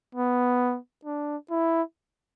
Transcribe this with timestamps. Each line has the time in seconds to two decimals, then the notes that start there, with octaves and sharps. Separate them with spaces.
0.15 B3
1.05 D4
1.50 E4